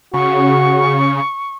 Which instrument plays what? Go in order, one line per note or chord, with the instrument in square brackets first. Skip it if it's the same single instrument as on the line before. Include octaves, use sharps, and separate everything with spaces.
[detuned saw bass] C#3 [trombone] F#4 [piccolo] C#6